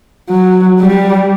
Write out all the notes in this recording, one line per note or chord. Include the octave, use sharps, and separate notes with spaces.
F#3
G3